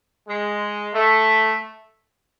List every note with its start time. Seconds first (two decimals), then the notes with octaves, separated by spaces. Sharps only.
0.28 G#3
0.94 A3